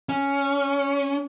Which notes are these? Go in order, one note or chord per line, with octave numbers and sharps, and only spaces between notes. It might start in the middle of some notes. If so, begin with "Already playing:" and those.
C#4